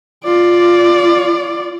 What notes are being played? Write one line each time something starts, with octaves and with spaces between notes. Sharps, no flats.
F4 D5